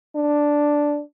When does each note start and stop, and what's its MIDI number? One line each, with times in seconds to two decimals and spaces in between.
0.16 1.01 62